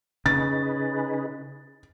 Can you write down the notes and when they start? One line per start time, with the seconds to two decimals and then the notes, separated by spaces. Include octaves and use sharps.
0.26 C#3 D#4 G#4 B4 A6